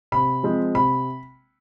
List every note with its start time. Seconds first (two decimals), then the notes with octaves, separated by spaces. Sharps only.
0.12 C3 B5
0.43 F3 G#3 C4
0.75 C3 B5